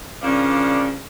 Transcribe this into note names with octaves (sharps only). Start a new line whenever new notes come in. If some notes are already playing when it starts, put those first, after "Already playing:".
C#3 F3 G3 A#3 D4